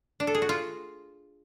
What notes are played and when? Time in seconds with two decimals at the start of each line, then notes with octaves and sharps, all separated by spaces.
0.20 D4
0.27 A4
0.35 G#4
0.42 F#4
0.49 F4